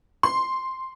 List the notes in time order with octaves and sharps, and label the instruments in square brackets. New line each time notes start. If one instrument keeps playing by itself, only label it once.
[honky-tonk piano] C6